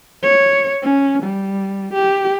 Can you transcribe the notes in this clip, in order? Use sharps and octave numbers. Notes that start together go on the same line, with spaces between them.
C#5
C#4
G3
G4